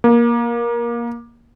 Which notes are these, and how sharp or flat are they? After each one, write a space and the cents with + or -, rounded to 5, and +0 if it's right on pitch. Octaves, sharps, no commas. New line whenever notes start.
A#3 +20